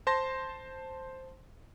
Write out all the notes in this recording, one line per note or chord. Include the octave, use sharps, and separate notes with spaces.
C5 A5 C6 A#6